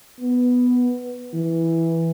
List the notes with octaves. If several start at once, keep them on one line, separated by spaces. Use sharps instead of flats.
B3
E3